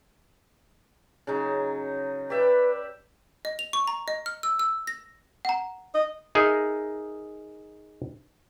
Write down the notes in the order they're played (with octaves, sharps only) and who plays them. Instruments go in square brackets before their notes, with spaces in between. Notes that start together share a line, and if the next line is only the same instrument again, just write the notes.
[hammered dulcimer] C#3 F#3 D#4
[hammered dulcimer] G4 D5 E5 [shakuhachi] B4
[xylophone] D#5
F7
C#6
A#5
D#5
F6
E6
E6
A#6
F#5 A#5
[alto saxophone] D#5
[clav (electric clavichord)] D#4 G#4 A#4 D#5 E5